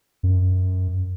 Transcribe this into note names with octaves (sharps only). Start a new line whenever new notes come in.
F#2